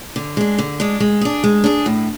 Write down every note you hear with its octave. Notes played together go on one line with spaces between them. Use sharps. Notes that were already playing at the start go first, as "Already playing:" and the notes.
D3
G#3 D4
D3
G#3 D4
G#3
D4 G#4
G#3
D4 G#4
A2